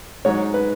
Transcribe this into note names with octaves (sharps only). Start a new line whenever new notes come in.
G#2 F#3 C#5
B4